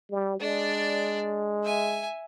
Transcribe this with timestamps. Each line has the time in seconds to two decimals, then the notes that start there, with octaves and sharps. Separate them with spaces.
0.11 G3
0.41 G#3 D4 D5
1.63 E5 G#5